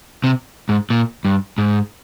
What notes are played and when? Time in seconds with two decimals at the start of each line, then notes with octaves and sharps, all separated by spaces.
0.24 C3
0.69 G#2
0.90 A#2
1.25 G2
1.58 G#2